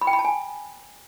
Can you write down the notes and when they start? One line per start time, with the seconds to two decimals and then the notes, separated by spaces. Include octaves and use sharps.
0.01 B5
0.07 G5
0.13 B5
0.19 A5
0.25 G#5